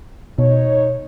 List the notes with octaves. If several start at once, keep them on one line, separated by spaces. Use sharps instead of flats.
B2 D#4 C#5